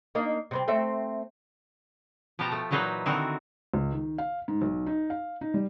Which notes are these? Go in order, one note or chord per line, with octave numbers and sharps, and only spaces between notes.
A#3 D4 D#4
C3 G3 C4
A3 C4 E5
B2 F3 B3 G4 A5 A#5
A3
A#2 E3 F#3 D#4 B4 C5
D3 D#3 C4 D#4 E4 F#4
C#2
D#3
F5
G#2
B1
D#4
F5
D#4
G3